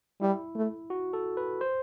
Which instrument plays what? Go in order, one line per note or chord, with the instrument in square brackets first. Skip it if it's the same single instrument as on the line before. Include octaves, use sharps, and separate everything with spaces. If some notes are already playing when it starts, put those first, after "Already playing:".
[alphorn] G3 [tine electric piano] E4
[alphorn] A3
[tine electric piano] F#4
A4
B4
C5